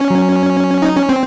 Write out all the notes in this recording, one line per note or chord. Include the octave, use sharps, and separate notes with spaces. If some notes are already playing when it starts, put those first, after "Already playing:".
Already playing: C#4
F#3
D#4
C#4
C4